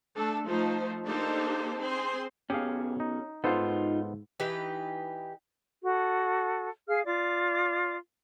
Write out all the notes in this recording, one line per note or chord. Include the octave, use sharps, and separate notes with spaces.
A3 D4 A4
F3 A3 D#4 C5
A#3 D4 D#4 G4 A4 C5
C4 G#4 C5 C6
B1 B3 C#4 G4 G#4 F5
D#4
G#2 B3 D#4 F4 A4 C5
E3 D#4 G4 B4
F#4 A4
G#4 F5 F6
F4 D5 D6